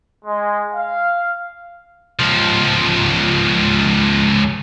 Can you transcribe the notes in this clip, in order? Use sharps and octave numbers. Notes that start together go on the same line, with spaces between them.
G#3
F5
C#2 F3